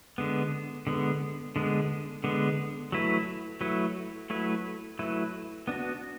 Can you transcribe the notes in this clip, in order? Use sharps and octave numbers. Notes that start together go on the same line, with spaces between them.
D3 G#3 B3
D3 G#3 B3
D3 G#3 B3
D3 G#3 B3
F#3 A3 E4 B4
F#3 A3 E4 B4
F#3 A3 E4 B4
F#3 A3 E4 B4
B3 D4 F#4